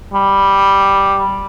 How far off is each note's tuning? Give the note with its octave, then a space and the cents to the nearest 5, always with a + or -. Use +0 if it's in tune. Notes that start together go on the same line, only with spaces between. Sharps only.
G3 +0